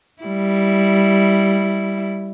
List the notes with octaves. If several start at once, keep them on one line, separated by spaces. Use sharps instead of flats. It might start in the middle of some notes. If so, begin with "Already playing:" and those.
G3 E4